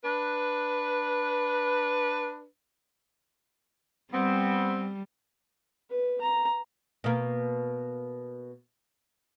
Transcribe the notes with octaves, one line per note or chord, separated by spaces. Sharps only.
D4 B4
G3 B3 C4
B4
A#5
B2 A#3